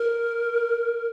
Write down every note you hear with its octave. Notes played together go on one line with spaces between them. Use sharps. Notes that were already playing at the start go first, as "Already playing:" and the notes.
Already playing: A#4